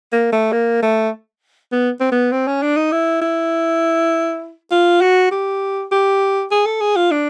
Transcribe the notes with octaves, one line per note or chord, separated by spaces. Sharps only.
A#3
A3
A#3
A3
B3
C4
B3
C4
C#4
D4
D#4
E4
E4
F4
F#4
G4
G4
G#4
A4
G#4
F4
D4